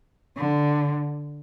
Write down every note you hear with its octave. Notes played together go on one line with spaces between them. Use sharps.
D3